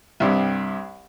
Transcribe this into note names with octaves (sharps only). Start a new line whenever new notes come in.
C2 G2